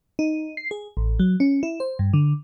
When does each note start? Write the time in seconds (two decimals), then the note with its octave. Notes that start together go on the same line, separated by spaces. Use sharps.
0.19 D#4
0.57 C7
0.71 G#4
0.97 A1
1.19 F#3
1.40 C#4
1.63 E4
1.80 C5
1.99 G2
2.14 D3